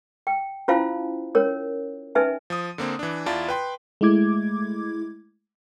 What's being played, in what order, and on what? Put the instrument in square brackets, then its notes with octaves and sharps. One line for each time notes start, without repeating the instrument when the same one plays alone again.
[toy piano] G5
C#4 E4 F4 C5 F5 A5
C#4 A#4 C#5
C#4 D#4 B4 E5 G#5 A5
[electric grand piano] F3 D#6
D3 A#3 C4
E3 D4
E2 E4 F4 D5 A5
B4 G5 C6
[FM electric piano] G#3 A3 E4 D6 G#6